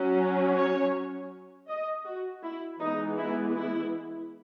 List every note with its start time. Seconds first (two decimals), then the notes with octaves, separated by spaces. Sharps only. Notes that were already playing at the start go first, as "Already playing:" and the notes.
Already playing: F#3 C#4
0.55 C#5
1.68 D#5
2.06 F#4
2.43 E4
2.80 E3 G#3 B3 D#4
3.18 E4
3.55 E4